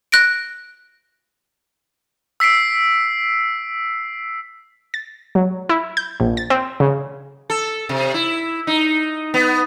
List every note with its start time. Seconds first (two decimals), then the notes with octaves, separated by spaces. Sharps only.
0.12 F#6 A#6 D7
2.40 E6 B6 C7 D7
4.94 A6
5.35 F#3
5.69 E4
5.97 G6
6.20 A#1
6.37 A6
6.50 C4
6.80 C#3
7.50 A4
7.89 C3
8.14 E4
8.67 D#4
9.34 B3